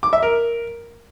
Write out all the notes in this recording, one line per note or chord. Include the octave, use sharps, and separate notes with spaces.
D6
E5
A#4